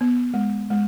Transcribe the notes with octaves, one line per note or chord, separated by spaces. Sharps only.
B3
G#3
G#3